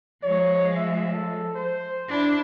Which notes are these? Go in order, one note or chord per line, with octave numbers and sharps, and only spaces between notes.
F3 G#3 C#5
E5
A4
C5
D4 E4